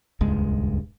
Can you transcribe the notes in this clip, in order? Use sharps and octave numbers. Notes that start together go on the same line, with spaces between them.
D#1 C#2 G2 G#3